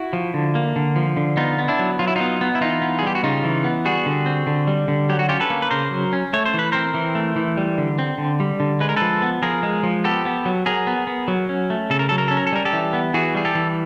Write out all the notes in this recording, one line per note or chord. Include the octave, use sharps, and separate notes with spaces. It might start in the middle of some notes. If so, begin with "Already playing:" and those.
Already playing: E4 F#4
F3
D3
A#3
D3
F3
D3
B3 D#4 F4
B3
D4 E4
F#3
F#3 F4
E4
B3 D#4 F4
B3
E4
E3 D#4 F4
B3
G#4
G3 G4
F#4
C#3 D#4 F4
E3
B3
G3 F#4 G#4
D3
C4
D3
G3
D3
F#3 G4
F#4
C#4 F4 G4
A4 B4
A#3
B4
C#3 A#4 C5
F#3
C#4
A3 C#5
C5
E3
B4
C4 A#4 C5
E3
A3
E3
G3
D3
C4
D3
G3
D3
G#3 B4
A#4
F3 A4 B4
B3
F3 G#4 A#4
G#3
F3
B3 G4 A4
B3
F#3
F#3 G#4 A#4
B3
B3
F#3
C#4
A3
C#3 A4
A#4
F#3 A4
A#4
C#4 A4
A#4
A4
G3 A#4
G4 A4
E3
B3
E3 F#4 G#4
G3 G#4
G4 A4
E3